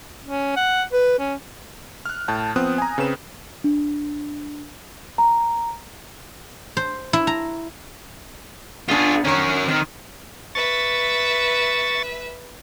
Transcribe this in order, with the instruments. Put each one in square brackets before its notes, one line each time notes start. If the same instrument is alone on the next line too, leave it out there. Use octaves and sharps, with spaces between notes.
[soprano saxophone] C#4
F#5
B4
C#4
[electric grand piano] F6 F#6
A2 A5 G6
F3 B3 C4 D#6 F#6
G#5 A#5
C#3 C4 B4 E7
[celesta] D4
A#5
[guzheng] C5
E4
A#5
[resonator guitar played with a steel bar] B3 D4 [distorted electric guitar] F4 G#4
[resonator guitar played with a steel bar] D#3 C#5 [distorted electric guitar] C#4 A#4
[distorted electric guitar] D#3 [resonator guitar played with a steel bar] C4
[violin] B4 E5 [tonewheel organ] C#6 A6